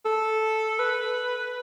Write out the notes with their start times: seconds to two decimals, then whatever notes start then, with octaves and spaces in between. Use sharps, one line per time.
0.05 A4
0.79 B4